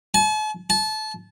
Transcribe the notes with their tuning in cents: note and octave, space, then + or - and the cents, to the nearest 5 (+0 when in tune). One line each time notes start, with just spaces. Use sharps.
A5 -45
A5 -25